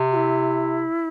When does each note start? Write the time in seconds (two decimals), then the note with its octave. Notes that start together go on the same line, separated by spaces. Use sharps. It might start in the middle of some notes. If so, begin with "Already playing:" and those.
Already playing: C3
0.12 F#4
0.16 E4